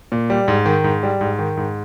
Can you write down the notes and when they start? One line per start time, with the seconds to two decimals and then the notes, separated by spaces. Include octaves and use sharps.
0.12 A#2
0.30 G3
0.48 G#2
0.66 D#3
0.84 G#2
1.03 G3
1.21 G#2
1.39 D#3
1.57 G#2